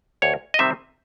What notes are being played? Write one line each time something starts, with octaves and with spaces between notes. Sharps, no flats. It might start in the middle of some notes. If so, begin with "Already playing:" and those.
D2 C#5
D#5
C3 D#3 G3 C4 E5